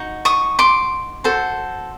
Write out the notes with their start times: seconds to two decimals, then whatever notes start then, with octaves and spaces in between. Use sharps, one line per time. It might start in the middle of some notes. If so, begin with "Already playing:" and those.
Already playing: D#4 F#4
0.25 C#6 D#6
0.59 C6 D6
1.24 F#4 A4 C5